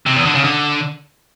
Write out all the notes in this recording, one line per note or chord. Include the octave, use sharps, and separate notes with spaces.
C3
E2
D3
C#3
D3